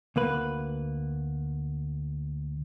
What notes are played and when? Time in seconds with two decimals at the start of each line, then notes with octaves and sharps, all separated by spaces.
0.16 D2 A#3 B4